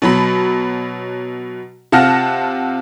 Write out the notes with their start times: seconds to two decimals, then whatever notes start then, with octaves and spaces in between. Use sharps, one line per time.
0.02 B2 F#3 B5
1.92 C3 F4 F#5 A5 F6 A#6